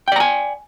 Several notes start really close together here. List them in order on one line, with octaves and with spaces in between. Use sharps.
G5 D5 A#5 G#5